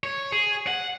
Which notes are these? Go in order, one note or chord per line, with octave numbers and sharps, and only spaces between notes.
C#5
G#4
F#5